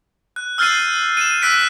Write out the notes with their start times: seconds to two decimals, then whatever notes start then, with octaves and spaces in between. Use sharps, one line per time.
0.36 F#6
0.58 E6 F6 G6 A6 C7 D#7
1.17 D#7 E7
1.42 E6 F#6 B6 D7